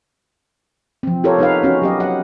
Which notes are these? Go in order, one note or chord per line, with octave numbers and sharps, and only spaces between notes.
F3 C4
F4 G4 A4 A#4 C5 C#5
B3 D#4 B4 F5
B3 C#4 D#4 F4 F#4
F#3 G4 D#5
F#5